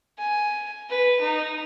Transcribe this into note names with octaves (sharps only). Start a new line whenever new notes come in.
G#5
B4
D#4